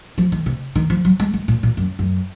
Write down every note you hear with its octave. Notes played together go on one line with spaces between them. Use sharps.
F3
D#3
C3
D#3
F3
F#3
G#3
G#3
A#2
A#2
F#2
F#2